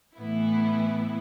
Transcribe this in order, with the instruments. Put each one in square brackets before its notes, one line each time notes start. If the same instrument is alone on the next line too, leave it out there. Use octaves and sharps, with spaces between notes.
[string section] A2 E3 B3 E4